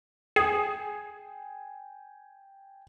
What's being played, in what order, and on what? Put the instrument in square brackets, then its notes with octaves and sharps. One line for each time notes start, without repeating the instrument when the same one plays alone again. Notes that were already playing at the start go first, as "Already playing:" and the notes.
[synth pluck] G#4 [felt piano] G5 G#5